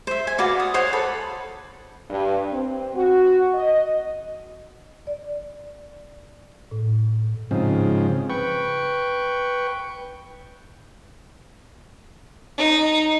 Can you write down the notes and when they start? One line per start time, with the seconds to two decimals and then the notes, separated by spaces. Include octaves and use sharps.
0.07 C5 E5
0.27 G#5
0.38 F#4 B4 D5 F5
0.60 D#6
0.74 C5 C#5 F#5 G#5
0.93 A4 B4 B5
2.10 G2
2.52 C4
2.96 F#4
3.54 D#5
5.07 D5
6.71 A2
7.51 G#2 C#3 F3 C4
8.30 B4 G5 C#6
12.58 D#4